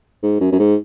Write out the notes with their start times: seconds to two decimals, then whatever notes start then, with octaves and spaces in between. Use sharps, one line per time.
0.23 G#2
0.41 F#2
0.52 F#2
0.59 G#2